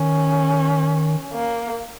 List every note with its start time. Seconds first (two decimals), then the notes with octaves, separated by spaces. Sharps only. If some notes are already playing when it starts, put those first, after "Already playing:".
Already playing: D#3 C#4
1.33 A#3